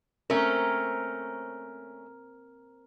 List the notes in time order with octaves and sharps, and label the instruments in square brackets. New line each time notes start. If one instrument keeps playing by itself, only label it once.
[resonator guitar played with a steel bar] A3 C#4 [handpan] C4 A#4